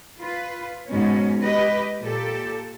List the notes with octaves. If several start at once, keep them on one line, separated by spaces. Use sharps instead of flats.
F4 B4
G#2 B2 C#4
G4 B4 D#5
A#2 G4 A4